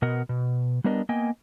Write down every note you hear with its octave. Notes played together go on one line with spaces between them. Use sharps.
B2 B3 A#4 D#5 F#5
B2
G3 B3 D4 A#4 C#5 D#5
A#3 B3 D#5 G5 G#5